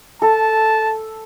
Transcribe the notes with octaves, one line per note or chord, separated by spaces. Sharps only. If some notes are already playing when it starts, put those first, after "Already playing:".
A4 A5